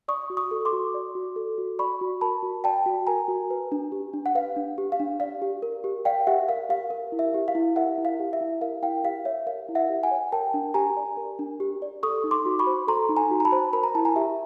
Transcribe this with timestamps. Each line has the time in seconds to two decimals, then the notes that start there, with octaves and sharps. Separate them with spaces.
0.08 D5 C#6 D#6
0.30 F#4
0.37 C#6 D#6
0.51 A4
0.65 C6 D6
0.72 F#4
0.94 D5
1.15 F#4
1.36 A4
1.58 F#4
1.79 D5 B5 C#6
2.01 F#4
2.21 A#4 A5 B5
2.43 F#4
2.64 D5 G5 A5
2.86 F#4
3.07 A#4 G#5 A#5
3.28 F#4
3.50 B4
3.72 D4
3.92 G4
4.13 D4
4.26 F#5
4.35 B4 F5
4.56 D4
4.78 G4
4.92 F5
5.00 D4
5.20 D5 F5
5.42 G4
5.62 A#4
5.84 G4
6.05 D5 F5 G5
6.27 G4 E5 F#5
6.48 A#4 F5
6.69 G4 F5
6.90 A#4
7.12 E4
7.19 E5
7.34 G4
7.48 F5
7.55 E4
7.76 A#4 E5 F#5
7.98 E4
8.05 F5
8.19 G4
8.33 E5
8.41 E4
8.61 A#4 F5
8.83 E4 F5 G5
9.04 G4 F5
9.25 C#5 E5
9.47 A#4 F5
9.69 E4
9.75 E5 F#5
9.89 G4
10.03 F#5 G#5
10.11 C#5
10.32 A#4 G5 A5
10.54 D4
10.74 G4 G#5 A#5
10.97 D5
11.17 A#4
11.39 D4
11.60 G4
11.82 D5
12.03 A4 C#6 D#6
12.24 D#4
12.31 C6 D6
12.46 F#4
12.59 B5 C#6
12.67 C5
12.87 A4 A#5 C6
13.09 D#4
13.16 G#5 A#5
13.31 F#4
13.40 A#5
13.45 A5 B5
13.52 C5
13.73 A#4 B5
13.83 A#5
13.95 E4 A5
14.05 G#5 A#5
14.16 G4 E5